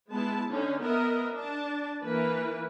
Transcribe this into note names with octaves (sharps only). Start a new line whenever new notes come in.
G#3 B3 E4 A5
D3 C#4 D#4
B3 A#4 D#5 E5
D4 A5
E3 A#3 B4